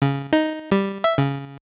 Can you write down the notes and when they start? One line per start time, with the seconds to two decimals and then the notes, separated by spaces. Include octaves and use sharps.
0.02 C#3
0.33 D#4
0.72 G3
1.04 E5
1.18 C#3